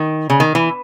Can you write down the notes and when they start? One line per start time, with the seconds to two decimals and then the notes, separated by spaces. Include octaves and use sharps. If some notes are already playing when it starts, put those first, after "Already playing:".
Already playing: D#3
0.30 C#3
0.40 D#3
0.55 E3